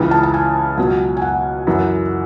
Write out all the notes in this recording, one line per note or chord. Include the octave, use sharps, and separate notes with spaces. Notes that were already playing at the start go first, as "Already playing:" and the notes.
Already playing: C#2 C#3 E3
A5
A5
G#5
C#2 B2 F#3
G#5
F#5
F#2 E3